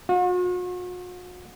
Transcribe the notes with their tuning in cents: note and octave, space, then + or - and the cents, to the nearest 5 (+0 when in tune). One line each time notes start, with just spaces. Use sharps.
F#4 -45